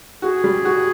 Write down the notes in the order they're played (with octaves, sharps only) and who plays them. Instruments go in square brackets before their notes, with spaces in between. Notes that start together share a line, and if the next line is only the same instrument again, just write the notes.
[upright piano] F#4 [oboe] G#4
[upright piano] G3
F#4